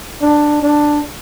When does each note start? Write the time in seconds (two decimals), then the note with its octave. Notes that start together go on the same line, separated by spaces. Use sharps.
0.22 D4
0.63 D4